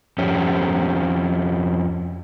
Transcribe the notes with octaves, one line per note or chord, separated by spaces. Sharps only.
F2 C#4 G4